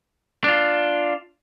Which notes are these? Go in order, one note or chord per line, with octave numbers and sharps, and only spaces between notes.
D4 F4